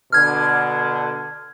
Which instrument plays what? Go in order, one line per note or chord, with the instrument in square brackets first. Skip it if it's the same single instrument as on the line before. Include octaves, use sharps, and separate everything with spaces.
[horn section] B2 D3 [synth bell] F6 G#6